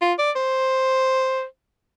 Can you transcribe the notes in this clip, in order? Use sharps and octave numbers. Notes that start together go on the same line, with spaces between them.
F4
D5
C5